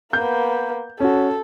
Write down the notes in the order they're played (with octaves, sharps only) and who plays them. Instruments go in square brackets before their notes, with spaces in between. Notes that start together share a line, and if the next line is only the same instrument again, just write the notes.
[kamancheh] A#3 B3 [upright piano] G6
[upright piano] C#4 F#4 [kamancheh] A4